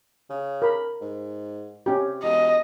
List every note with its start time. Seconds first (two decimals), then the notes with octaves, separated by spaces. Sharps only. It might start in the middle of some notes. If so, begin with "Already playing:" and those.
0.30 C#3
0.62 A#4 B5
1.01 G#2
1.86 C3 C#4 G4
2.23 E1 D#5